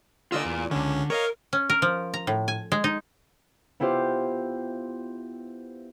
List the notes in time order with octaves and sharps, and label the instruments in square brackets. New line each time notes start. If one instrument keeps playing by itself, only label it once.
[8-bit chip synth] D3 D#5 E6 [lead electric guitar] F4 D5
[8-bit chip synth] E2
[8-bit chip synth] C#2 C#4 [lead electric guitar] D3
[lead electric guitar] A#4 [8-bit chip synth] C#5 D#5 F5
[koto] C#4
A#4
F3
A#5
A2
G#5
G#3
D#4
[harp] B3 E4 F4 G4 C5